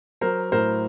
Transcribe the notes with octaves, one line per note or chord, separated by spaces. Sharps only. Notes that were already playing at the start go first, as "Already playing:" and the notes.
F#3 A#4 C5
A2 A#4 C5